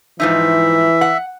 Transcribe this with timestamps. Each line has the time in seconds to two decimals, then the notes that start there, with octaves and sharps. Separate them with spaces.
0.20 G#2 E3 F3 D#4 E5
1.01 F#5